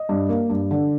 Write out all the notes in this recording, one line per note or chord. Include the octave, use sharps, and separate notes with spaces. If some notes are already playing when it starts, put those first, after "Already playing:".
Already playing: D#5
G2
A#3
G2
D3